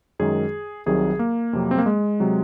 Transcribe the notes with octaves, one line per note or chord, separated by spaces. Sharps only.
F#2 D#3 G#3 G#4
C2 C3 D#3 F#3 G#4
A#3
F2 C3 F#3
C4
A#3
G#3
C3 F#3